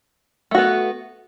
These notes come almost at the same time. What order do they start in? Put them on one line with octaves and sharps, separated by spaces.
A3 F#4 B3